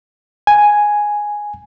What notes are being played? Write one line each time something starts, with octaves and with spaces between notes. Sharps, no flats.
G#5